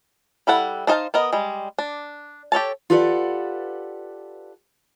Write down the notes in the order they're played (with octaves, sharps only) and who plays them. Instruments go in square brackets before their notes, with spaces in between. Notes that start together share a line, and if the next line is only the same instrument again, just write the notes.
[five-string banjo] G3 E4 A4 F#5
D4 D#4 C5 F5 A5
B3 A#4 D#5
G3 G#3
D4
G4 A4 C#5 A5
[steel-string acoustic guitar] F4 G4 A4 B4 D5 F#5